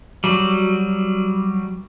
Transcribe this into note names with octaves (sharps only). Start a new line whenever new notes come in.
F#3 G3